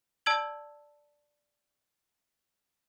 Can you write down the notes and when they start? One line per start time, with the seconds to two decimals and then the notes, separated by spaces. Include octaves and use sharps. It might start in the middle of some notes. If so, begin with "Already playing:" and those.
0.26 D5 A5 E6 G#6 F#7